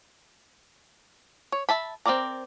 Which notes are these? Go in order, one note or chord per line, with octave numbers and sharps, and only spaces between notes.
C#5
E5 A5 B5
C4 D#4 A#4 D5 A#5